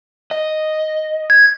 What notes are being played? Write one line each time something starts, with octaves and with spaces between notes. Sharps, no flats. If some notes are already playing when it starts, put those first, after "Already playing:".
D#5
G#6